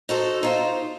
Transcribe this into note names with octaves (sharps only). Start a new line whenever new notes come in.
D#4 F#4 A4 C5
D#4 F4 C5